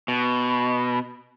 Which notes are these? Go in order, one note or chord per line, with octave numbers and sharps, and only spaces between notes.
B2